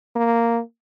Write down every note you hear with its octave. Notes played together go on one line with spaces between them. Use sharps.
A#3